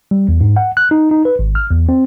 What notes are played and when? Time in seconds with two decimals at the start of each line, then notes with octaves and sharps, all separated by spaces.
0.11 G3
0.28 E2
0.41 G#2
0.56 F#5
0.77 F#6
0.91 D#4
1.11 D#4
1.25 B4
1.39 G#1
1.55 F6
1.71 E2
1.89 C4